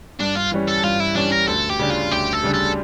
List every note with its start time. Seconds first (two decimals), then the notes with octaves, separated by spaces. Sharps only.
0.20 G2 D4
0.36 F4
0.52 E3 G3 C#4
0.68 A4
0.83 G2 F4
1.00 E4
1.15 E3 G3 C#4 D4
1.32 A#4
1.47 D2 A4
1.69 G4
1.79 C#3 G3 D4
1.90 F4
2.11 D2 G4
2.33 A4
2.43 C#3 G3 D4
2.54 A4